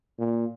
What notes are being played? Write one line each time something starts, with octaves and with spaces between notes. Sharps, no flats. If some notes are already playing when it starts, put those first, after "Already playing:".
A#2